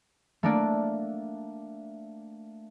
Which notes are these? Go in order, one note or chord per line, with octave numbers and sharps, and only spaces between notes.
A3 A#3 D4